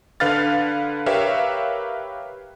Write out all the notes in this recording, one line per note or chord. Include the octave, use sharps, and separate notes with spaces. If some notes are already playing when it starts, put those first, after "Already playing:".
D3 B4 F5 F6 A6
G4 A#4 B4 C#5 E5 F5